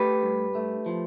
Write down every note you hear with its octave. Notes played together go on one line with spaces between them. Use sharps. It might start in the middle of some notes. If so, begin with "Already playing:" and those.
Already playing: A3 G4 B4
G2
A3
F3